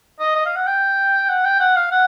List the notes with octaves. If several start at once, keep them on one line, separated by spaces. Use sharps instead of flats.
D#5
D#5
F5
F#5
G5
F#5
G5
F#5
F5
F#5